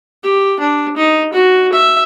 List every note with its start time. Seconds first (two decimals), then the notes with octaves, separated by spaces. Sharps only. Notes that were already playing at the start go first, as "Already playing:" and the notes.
0.23 G4
0.60 D4
0.97 D#4
1.33 F#4
1.73 E5